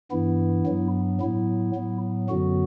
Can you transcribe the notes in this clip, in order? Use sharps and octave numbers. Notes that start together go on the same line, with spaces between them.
G2 E3 B3 E4
G2 F#3 B3
A2 F#3 B3 E4
A2 F#3 B3
F#2 D3 F#3 B3 F#4